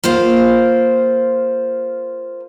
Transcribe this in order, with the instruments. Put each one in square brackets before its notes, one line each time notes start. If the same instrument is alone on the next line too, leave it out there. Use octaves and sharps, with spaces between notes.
[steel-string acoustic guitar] A#3 F4 C5 F5